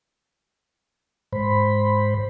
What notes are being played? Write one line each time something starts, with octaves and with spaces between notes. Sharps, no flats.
G#2 C5 B5